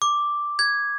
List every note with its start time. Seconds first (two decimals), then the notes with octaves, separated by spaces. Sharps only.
0.02 D6
0.59 G#6